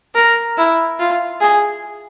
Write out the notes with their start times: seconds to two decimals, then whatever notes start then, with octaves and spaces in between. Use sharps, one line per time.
0.15 A#4
0.57 E4
0.99 F4
1.40 G#4